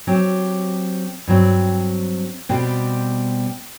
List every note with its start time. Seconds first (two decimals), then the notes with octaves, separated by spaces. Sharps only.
0.07 F#3 C4 G4
1.27 G2 F#3 C4
2.49 B2 G3 C4 G4